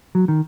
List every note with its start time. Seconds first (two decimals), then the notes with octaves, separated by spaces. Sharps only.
0.15 F#3
0.28 D#3